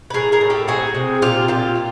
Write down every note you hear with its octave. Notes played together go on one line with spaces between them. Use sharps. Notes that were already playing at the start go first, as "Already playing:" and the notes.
B4
A2 G#4 A#4
G#4 A#4
A2
G4 A4
C4 F#4 G#4
C3
A#2 F4 G4
A#2 F4 G4
F4